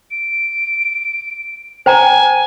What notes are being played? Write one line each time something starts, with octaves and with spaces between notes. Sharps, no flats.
D7
C5 G5 G#5 A#5